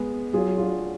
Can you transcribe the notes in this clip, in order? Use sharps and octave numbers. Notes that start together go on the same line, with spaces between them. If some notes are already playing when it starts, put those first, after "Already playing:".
Already playing: G#3 B3
F#3 F4 G#4
F4
D4 F#4